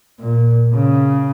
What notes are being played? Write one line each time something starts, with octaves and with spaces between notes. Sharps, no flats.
A#2
C#3